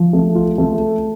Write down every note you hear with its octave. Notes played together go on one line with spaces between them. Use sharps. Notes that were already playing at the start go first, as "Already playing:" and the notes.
Already playing: F3
A3
F4
A3